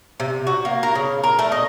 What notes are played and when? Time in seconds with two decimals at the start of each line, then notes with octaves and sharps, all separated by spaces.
0.20 C3
0.47 F#4
0.65 A#3
0.83 A#4
0.95 C#3
1.23 A#4
1.39 A3
1.52 D#5